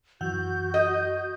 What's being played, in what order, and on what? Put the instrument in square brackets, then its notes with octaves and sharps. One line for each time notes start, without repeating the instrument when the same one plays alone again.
[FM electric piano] F#2 E3 F#5 [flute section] F#4 G6
[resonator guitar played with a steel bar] D#5